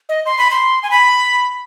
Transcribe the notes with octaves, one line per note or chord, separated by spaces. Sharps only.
D#5
C6
B5
C6
G#5
B5